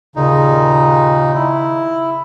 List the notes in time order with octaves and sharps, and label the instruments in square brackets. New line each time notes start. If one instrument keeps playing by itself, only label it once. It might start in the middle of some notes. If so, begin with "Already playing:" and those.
[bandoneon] D#2 A#2 D#4 [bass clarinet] C#3
[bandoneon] E4